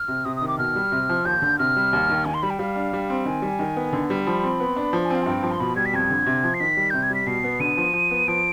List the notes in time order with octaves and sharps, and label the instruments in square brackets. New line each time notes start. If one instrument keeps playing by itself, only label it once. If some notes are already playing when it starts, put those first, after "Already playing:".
Already playing: [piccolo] F6
[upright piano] C3
[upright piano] C3 [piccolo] D#6
[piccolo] D#6
[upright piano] D#3
[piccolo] D6
[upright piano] B2 [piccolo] F6
[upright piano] G3
C3
F3
[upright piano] D#2 [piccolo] G6
[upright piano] D3
[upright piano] C3 [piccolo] F6
[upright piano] G3
D#2
D#3
[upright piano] D#3 [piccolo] G#5
[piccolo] C6
[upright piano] G3 [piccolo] B5
[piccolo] G5
[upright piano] G3 [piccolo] F5
[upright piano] D4
G3
C4
[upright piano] D#3 [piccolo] G#5
[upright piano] G3
D#3
B3
D3
G3
[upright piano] F3 [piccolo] B5
[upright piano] C4
B3
D4
F3
[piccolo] G#5
[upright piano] C4 [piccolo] F5
[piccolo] G#5
[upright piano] G2 [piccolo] G5
[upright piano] F3
[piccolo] C6
[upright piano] B2 [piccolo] B5
[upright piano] G3 [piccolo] G#6
[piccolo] B6
[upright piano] F2 [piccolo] G#6
[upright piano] D3
C3
F3
[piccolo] C7
[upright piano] D#3 [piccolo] B6
[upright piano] G3
[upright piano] C3 [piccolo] G6
[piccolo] G#6
[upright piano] G3 [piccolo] B6
[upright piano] B2 [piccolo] C7
[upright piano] B3
[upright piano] D3 [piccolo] D#7
[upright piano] F3
F3
B3
[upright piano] F3 [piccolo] D7